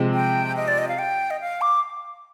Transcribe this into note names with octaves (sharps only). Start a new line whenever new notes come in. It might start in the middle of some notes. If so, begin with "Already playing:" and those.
Already playing: C3 F3 G#3 C4
G5
D#5
D5
D#5
F5
G5
D#5
F5
D6